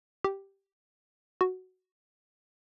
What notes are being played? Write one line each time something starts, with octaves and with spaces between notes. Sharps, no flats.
G4
F#4